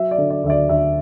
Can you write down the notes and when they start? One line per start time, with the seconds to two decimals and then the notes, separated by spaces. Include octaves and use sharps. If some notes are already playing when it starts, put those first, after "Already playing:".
Already playing: F#3 E5
0.11 D5
0.18 D3
0.30 D5
0.44 D2 E5
0.50 D5
0.69 D2 E5